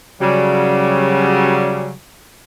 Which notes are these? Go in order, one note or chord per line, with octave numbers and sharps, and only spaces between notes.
C#3 F#3 G3